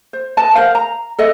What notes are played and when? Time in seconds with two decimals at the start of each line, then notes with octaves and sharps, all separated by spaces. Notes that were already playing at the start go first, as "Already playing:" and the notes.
0.13 C5
0.37 B4 D#5 A5
0.54 A#4 C5 F5 F#5
0.75 A#5
1.18 A4 D#5 E5